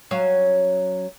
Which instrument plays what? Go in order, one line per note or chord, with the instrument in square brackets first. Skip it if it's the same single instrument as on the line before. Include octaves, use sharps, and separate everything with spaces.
[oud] F#3 C#4 F5